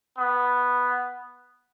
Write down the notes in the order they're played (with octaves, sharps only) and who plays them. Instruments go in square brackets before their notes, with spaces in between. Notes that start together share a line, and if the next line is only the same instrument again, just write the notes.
[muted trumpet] B3